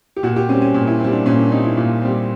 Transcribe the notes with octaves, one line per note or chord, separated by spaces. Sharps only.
G4
A#2 F#4
G4
G3 C4 C#4
C#4
A#2
E4
G3 C4
D4
A#2 C#4
D4
G3 C4 D#4
E4
A#2 F4
G3 C4